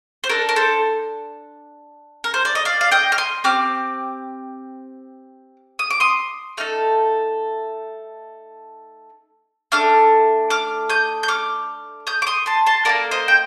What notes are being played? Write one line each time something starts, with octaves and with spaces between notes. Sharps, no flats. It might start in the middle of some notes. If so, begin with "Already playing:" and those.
C5
D4 A4 A#4
A#4
A4 C5
A#4
C5
D5
D#5
D5 F5
F5
D#5 G5
F6
C6 D#6
C4 G4 D6 F6
D#6
D6
C6 D#6
A3 D#4 A4 F6
A3 D4 A4 D6 F6
D6 F6
D#6 G6
G6
D6 F6
D#6 G6
D6
C6 D#6
A5 C6
A5 C6
A#3 F4 A4 A#4 D5
C5 D#5
G5